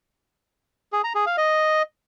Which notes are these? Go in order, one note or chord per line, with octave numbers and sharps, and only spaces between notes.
G#4
A#5
G#4
F5
D#5